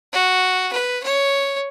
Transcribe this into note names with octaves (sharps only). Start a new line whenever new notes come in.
F#4
B4
C#5